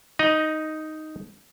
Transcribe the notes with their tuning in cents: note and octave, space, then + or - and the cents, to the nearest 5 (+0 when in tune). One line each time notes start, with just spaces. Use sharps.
D#4 +0 D#5 +0 A#5 +30